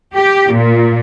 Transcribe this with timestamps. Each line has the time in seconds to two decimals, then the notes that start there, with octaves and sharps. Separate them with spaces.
0.16 G4
0.52 A#2